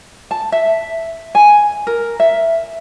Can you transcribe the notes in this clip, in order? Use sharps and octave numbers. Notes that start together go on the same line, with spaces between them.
A5
E5
G#5
A#4
E5